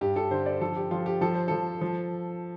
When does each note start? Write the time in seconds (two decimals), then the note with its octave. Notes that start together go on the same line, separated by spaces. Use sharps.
0.01 G2 G4
0.16 A4
0.31 D3 C5
0.46 D5
0.61 F3 A4
0.76 G4
0.91 F3 F4
1.06 G4
1.21 F3 A4
1.35 C5
1.48 F3 A4
1.81 F3